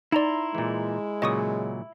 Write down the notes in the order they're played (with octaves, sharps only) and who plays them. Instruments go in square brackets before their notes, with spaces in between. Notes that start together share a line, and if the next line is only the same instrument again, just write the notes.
[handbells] D#4 D5 [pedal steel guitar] E4 A#5 C6
[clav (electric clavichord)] A#2 E3 [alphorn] G#3
[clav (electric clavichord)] A#2 C#3 F#3 [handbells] D#5 C#6 D#6